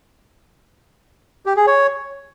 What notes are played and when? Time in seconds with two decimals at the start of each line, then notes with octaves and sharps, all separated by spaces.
1.46 G4
1.56 G#4
1.67 C#5